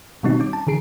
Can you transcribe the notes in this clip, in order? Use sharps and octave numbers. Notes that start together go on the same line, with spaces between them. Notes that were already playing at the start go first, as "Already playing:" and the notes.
B2 D#3 G3 C4 D#4 F#4
C#4 D6
A5
D3 E3 G#4 C7 D7